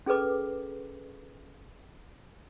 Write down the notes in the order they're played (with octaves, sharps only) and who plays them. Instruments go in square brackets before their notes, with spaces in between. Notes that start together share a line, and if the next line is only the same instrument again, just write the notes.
[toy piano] C#4 G#4 A4 B4 D6